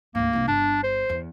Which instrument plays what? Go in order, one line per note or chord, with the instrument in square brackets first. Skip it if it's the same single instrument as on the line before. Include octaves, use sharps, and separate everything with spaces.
[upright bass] D2 G#2 [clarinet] A#3
[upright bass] C2 G2
[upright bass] G1 [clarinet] D4
[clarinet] C5
[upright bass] E2